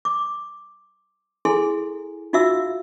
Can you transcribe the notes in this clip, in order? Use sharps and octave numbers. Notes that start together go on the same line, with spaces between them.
D6
E4 G#4 A4 G#5 C6
D#4 F4 F#4 E5 F5 E6